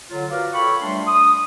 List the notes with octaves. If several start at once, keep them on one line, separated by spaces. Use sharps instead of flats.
D3 F#3 F4
F4 F#4 A#4 B4 D5 F5
A4 C#5 G5 B5 C#6
G3 A3 D4 C6
D#6